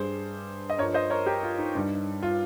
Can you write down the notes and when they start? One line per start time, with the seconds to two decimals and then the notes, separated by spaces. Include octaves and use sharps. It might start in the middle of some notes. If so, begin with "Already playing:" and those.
Already playing: G2 G3 G#4 C5
0.70 D#5
0.78 G2 F3 A#4 C#5
0.94 C5 D#5
1.10 A#4 C#5
1.26 G4 A#4
1.43 F4
1.58 D#4
1.75 G2 G3
2.23 F4